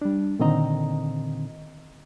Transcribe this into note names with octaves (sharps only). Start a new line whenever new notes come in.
G3 D4
A#2 D3 D#3 C4 D#5 A#5